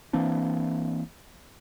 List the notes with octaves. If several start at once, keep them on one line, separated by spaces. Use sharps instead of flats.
E3 A#3 C4 D4